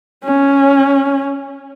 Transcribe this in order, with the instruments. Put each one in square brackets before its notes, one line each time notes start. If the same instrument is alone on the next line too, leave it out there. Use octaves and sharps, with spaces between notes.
[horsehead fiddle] C#4